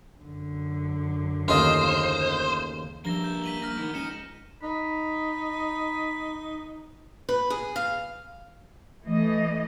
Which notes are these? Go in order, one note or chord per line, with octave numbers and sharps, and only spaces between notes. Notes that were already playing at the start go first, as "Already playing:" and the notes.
F#2 D3
D#2 C#3 A3 F4 C5 D#5
G2 F3 A#3 E5 A#6 G7
G6
B6 D#7 F#7
A#1 F6 A#6 B6
D#3 B3 A#4
C#2 D#4 D#5 C#7 E7
D#4 B5
B4
G#4
F5
E3 A3 D#5